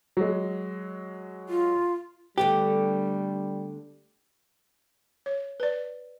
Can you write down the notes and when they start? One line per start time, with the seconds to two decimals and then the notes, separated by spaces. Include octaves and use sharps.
0.17 F#3 G#3
1.49 F4
2.38 D3 G3 A3 B3 G4
5.26 C#5
5.60 B4 D5